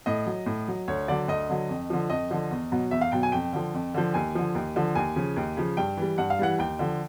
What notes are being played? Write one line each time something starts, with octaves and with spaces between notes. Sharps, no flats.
A2 D#5
F#3
A2
F#3
D2 C#5
D3 F#3 D5
D2 D#5
D3 F#3
F2
D3 F3
F2 D#5
D3 F3
E2
B2 F#3
E2 E5
F5
B2 F#3 G5
G#5
F2 G5
D3 F3
F2
D3 F3
D#2 G#5
D3 F3
D#2
D3 F3
D#2 G#5
C#3 F3
D#2
C#3 F3
G2 G5
E3 G3
G2 F#5
F5
E3 G3 F#5
D#2 G5
D3 F3